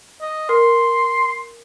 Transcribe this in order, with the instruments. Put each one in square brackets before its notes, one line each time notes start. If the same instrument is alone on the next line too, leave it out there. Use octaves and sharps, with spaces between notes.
[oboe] D#5
[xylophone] A#4 [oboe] C6